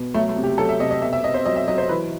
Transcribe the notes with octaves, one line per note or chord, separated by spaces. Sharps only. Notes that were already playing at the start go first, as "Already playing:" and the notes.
Already playing: B2
F#3 A3
A3
C3
G4
F#3 A4
E5
C3 D#5
D#5
B2 E5
E5
B2 D#5
C5
F#3 D#5
E5
F#3 D#5
C5
E3 B4